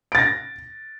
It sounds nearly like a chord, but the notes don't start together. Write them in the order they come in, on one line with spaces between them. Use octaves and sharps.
D7 A6 A#6